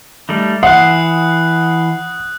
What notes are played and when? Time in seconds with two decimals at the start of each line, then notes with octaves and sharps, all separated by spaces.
0.29 G3 A3 D#4
0.63 E3 F#5 C6 D#6 F#6